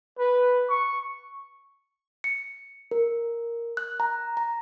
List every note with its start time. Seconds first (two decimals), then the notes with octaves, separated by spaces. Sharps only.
0.19 B4
0.69 C#6
2.24 C#7
2.91 A#4
3.77 F#6
4.00 A#5
4.37 A#5